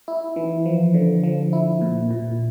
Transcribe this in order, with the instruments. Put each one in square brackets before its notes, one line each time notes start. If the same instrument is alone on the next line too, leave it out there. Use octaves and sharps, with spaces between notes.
[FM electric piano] E4
E3
F3
D3
F3
E4
A#2
A#2